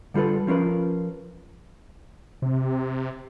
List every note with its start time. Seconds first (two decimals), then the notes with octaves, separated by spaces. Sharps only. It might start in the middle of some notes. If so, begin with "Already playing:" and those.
0.14 D3 G3 F4 A4 B4
0.47 F3 C#4 F4 A#4 B4
2.42 C3